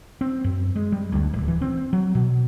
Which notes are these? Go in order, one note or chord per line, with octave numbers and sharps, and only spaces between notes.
C4
F#2
G#3
G3
D2
D1
E3
C4
F#3
B2